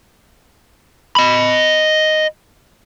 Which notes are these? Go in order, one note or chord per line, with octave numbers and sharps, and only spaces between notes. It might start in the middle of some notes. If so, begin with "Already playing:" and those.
D#5 B5